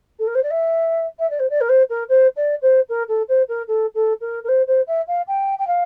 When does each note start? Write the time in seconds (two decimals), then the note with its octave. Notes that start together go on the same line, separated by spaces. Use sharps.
0.19 A4
0.27 A#4
0.35 C5
0.43 D5
0.50 E5
1.19 E5
1.30 D5
1.39 C5
1.50 D5
1.61 A#4
1.69 C5
1.90 A#4
2.09 C5
2.36 D5
2.62 C5
2.89 A#4
3.08 A4
3.28 C5
3.49 A#4
3.68 A4
3.95 A4
4.21 A#4
4.44 A#4
4.48 C5
4.67 C5
4.87 E5
5.08 F5
5.27 G5
5.59 G5
5.67 F5